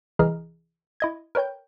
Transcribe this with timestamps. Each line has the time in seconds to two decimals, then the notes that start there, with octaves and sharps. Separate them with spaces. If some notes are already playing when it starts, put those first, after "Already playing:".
0.19 C2 E3 G#4 D#5 A#5 F6
1.00 E4 D#5 G#6
1.35 A#4 B4 C#5 G5 G6